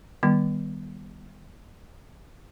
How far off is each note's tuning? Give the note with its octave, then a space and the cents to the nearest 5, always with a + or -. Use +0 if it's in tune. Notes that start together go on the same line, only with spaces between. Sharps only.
D#3 -15 G3 +0 B3 -25